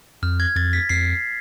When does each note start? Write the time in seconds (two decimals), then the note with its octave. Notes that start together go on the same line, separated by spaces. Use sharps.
0.22 F2 F6
0.40 G#6
0.55 F2 A6
0.73 B6
0.89 F2 C7